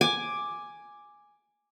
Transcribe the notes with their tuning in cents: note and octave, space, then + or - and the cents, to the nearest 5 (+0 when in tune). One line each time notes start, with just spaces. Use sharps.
G#5 +0 D6 +5